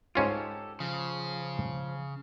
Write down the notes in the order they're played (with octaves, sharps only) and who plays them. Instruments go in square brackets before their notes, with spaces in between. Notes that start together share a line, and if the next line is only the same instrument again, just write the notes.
[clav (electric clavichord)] G#2 C#4 F4 [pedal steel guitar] G4 A4
[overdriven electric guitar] C#3 [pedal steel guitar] F3